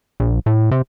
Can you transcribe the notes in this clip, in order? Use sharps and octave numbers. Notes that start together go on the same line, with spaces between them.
A#1
A2
C3